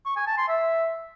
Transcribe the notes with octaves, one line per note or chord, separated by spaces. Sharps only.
C#6
G#5
A5
C6
E5